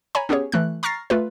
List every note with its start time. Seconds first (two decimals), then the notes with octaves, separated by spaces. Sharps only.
0.15 C#5 G#5 A#5 B5
0.29 B3 C#4 G4 G#4 C#5
0.52 E3 A3 F#6
0.83 A#5 C#6 F6 A6 A#6 C7
1.10 A3 F4 B4